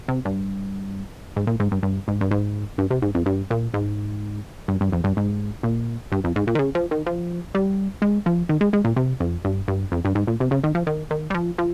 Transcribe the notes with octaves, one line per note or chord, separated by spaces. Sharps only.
C3
G2
G#2
A#2
G#2
G2
G2
G#2
G2
G#2
G2
C3
G#2
F2
G2
A#2
G#2
G2
G2
F2
G2
G#2
A#2
G2
F2
G#2
A#2
D#3
C#3
F3
D#3
F3
G3
G#3
F3
D#3
G#3
G#3
A#2
C3
F2
G2
G2
F2
G2
G#2
A#2
C3
C#3
D#3
F3
D#3
D#3
G3
F3
F3